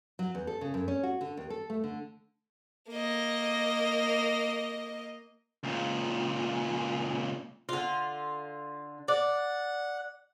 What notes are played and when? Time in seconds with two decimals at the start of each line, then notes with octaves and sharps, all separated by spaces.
0.19 F#3
0.35 E2
0.47 A4
0.61 C#3
0.74 F#2
0.88 C#4
1.03 F#4
1.21 D3
1.37 D#2
1.50 A4
1.70 A3
1.84 D3
2.90 A#3 D#5
5.63 C#2 A#2
7.69 D3 F4
9.08 D5 F#5